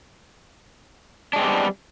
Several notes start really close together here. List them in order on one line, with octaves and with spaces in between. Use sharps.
D4 G#3 C4 B3 G3